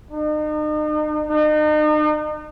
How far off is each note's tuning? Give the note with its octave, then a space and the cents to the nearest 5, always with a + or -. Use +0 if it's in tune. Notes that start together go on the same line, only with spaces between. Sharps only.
D#4 -40
D#4 -40